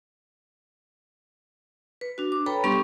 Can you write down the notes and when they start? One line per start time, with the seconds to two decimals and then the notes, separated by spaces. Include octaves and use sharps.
2.01 B4
2.18 D4 F#4
2.32 D6
2.46 A4 B4 C#5 G5 A#5 B5
2.64 G3 B3 D4 G4 C6 C#6